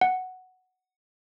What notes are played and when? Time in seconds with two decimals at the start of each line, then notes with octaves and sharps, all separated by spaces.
0.01 F#5